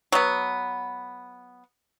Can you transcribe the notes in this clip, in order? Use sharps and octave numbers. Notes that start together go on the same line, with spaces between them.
F#3 B3